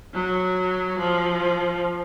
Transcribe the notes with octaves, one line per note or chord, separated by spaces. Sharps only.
F#3
F3